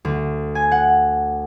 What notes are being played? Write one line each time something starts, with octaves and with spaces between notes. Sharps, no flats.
D2
G#5
F#5